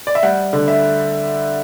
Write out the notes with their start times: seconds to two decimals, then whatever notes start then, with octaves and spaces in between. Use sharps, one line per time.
0.07 D5
0.15 E5
0.23 G3 F#5
0.53 D3
0.68 E5